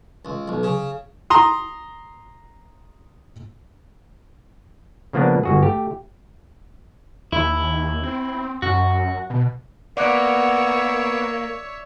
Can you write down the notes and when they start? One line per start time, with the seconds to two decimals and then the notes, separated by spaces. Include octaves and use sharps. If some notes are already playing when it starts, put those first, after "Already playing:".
0.25 C#2
0.48 B1
0.63 C#3
1.30 A#5 C6 D#6
5.13 C#3 F3 A#3 B3 D4
5.43 G1 F#4 G#4
5.62 A3 G4
7.32 D#2 E4
8.03 C4
8.62 F#2 F#4
9.30 B2
9.97 A#3 B3 C#5 D5 E5 F#5 D6 F#6